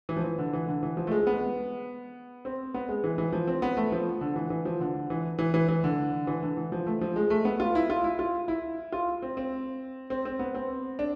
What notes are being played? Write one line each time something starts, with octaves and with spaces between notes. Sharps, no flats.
E3
F3
E3
D3
E3
D3
E3
F3
A3
G#3
B3
C4
B3
G#3
E3
E3
F3
C4
B3
A3
F3
D3
E3
E3
F3
D3
E3
E3
E3
E3
D3
E3
D3
E3
F3
A3
F3
G#3
A3
B3
F4
E4
F4
E4
F4
E4
F4
C4
C4
C4
C4
B3
C4
D4